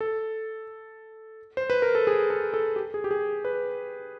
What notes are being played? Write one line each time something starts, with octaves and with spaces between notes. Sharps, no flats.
A4
C5
B4
A#4
A4
G#4
A4
A4
G4
G#4
G4
G#4
B4